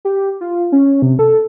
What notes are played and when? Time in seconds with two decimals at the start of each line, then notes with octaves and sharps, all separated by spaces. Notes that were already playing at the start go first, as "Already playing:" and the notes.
0.05 G4
0.41 F4
0.72 C#4
1.02 C3
1.19 A4